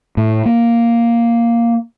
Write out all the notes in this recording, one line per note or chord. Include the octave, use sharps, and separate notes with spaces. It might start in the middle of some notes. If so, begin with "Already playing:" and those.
A2
A#3